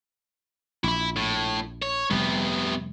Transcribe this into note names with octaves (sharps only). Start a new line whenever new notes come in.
A#1 E4 B5
A2
C#5
F1 C3 G3 B3